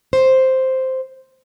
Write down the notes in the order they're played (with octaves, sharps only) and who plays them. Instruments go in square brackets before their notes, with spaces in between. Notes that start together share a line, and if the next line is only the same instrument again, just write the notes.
[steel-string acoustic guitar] C5